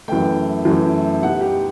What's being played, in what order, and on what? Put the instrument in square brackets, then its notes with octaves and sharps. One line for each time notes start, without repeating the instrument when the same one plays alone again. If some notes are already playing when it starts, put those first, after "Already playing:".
[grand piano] F#2 E3 A3 G5
F#2 E3 A3
B2 G3 D#4 F#5
G4